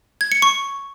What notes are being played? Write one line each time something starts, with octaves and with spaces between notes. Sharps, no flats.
G#6
C#7
C#6